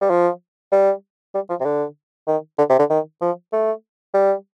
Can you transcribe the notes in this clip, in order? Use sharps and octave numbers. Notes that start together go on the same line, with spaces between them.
G3
F3
G3
G3
F3
C3
D3
D#3
D3
C3
D3
D#3
F3
A3
G3